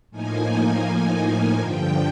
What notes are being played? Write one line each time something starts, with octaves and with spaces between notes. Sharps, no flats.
A2 F3 A#3 D#4 G#5
G2 D3 F3 G5